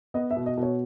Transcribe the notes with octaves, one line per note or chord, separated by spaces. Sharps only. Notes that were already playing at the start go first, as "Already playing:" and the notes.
B3 D#5
E5
B2
D#5
B2
C#5